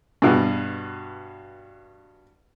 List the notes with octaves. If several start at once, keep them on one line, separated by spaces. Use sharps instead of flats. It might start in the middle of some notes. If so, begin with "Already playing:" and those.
G2 B2